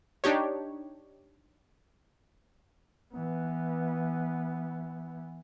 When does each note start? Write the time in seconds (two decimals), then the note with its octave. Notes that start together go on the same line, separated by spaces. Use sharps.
0.24 D4 D#4 G4 C#5
3.14 E3 B3